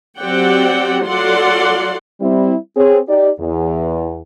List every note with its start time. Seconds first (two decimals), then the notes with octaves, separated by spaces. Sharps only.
0.19 F#3 C4 G4 D5 F#5 G5
1.05 F#3 F4 A4 D5 F#5 C6
2.21 G3 C4 E4
2.76 C4 G#4 C#5
3.08 D#4 G4 D5
3.39 E2